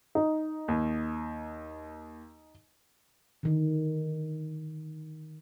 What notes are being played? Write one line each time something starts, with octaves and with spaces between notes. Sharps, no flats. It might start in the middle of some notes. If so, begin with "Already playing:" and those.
D#4
D#2
D3 D#3